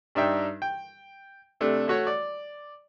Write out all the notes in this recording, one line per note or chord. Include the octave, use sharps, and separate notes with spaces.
G2 D4 D#4 E5 G5
G5
C3 A3 D4
A3 F#4 C#5
D5